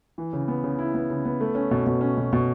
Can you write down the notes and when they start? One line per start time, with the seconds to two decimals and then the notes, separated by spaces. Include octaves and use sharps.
0.18 E3
0.33 C#3
0.48 B3
0.64 C#3
0.79 E4
0.94 B3
1.10 C#3
1.25 B3
1.41 A3
1.55 C#4
1.71 B2
1.86 B2
2.01 C#4
2.17 B2
2.33 B2